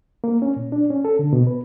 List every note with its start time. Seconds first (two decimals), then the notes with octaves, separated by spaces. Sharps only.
0.24 A#3
0.42 C#4
0.56 A#2
0.72 D4
0.90 C#4
1.05 A4
1.19 D3
1.33 B2
1.47 B4